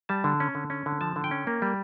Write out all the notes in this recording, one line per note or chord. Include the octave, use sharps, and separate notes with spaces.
G3 A5
D3
C#4
D3
C#4
D3
F3 A5
D3
G5
C#4
A#3
G3